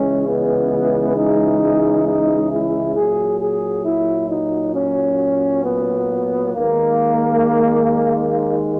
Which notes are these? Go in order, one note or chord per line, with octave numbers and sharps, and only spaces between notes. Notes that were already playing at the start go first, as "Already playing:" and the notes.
Already playing: C#2 C#3 E3 G#3 C#4
B3
D#4
D#4
E4
A#2 F#3 G#4
G#4
E4
D#4
C#4
B3
D#2 D#3 G#3 A#3
A#3